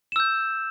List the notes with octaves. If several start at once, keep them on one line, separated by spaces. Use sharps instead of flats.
E6 G6 E7